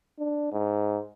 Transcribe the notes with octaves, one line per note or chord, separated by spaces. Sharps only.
D4
G#2